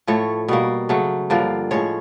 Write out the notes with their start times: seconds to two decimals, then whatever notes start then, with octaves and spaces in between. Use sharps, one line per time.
0.07 A2 F3 A3 C#5
0.48 B2 G3 A#3
0.89 C#3 F#3 A3
1.30 G2 D3 F3 A#3
1.71 A2 F3 G#3 C#5